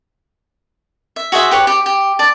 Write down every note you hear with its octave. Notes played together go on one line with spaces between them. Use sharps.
E5
F#4 G#4 C5 E5
G4 B4 C#5
G4
G4
D5 A5